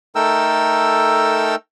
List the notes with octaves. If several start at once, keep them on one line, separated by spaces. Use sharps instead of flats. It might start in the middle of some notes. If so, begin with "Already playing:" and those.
A3 D#4 A4 A#4 G5 E6